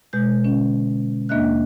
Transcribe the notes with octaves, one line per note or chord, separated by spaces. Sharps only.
B2 G#3 G6
D3 C#4
D#2 A#3 D4 D#5 E5 F#6